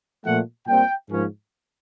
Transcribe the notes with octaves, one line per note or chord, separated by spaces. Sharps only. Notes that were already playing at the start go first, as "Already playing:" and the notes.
A#2 F3 A3 F#5
A#2 G3 C4 G5
G#2 F3 A#3 C#4